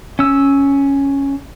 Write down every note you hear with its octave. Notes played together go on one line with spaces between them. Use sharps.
C#4 E6